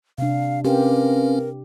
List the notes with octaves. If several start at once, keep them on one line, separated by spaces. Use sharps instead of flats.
C3 D4 F5
C4 C#4 G4 A#4 B4 F5